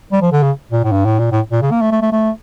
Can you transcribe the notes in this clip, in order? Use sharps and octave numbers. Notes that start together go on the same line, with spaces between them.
G3
F3
D3
C#3
A#2
A2
G2
A2
A#2
A2
A#2
C#3
A#3
A3
A3
A3
A3